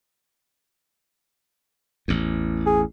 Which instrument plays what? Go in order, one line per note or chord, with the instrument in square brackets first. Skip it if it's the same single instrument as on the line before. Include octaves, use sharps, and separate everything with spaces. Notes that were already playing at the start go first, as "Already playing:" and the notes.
[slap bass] A1 E2
[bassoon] G#4